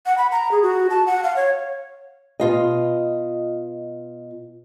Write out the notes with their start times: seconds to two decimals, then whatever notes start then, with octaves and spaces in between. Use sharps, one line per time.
0.06 F#5
0.18 B5
0.32 A#5
0.51 G#4
0.63 F#4
0.90 A5
1.07 F#5
1.23 F5
1.36 C#5
2.40 B2 F4 D#5